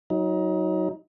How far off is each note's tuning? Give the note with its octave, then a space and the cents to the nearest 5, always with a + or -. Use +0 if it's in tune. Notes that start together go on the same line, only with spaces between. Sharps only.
F#3 +0 D#4 +25